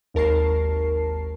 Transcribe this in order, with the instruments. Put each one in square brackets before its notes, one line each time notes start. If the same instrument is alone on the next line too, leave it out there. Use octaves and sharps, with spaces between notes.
[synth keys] G#1 D#2 A#4 A5 C#6 C7